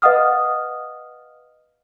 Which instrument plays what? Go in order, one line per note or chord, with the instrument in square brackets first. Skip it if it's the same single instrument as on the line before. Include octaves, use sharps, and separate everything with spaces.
[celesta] B4 D#5 F5 F#5 D#6 F6